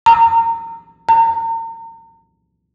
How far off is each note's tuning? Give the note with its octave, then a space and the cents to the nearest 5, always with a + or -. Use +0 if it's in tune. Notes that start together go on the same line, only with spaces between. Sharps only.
A#5 -30
A#5 -40